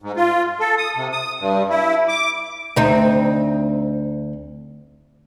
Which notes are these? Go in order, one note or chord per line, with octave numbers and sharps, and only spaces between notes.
G#2
F4
A4
D#6
C3
D#6
G2
E4
D6
D2 C4 D#4